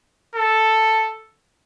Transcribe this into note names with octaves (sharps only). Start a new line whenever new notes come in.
A4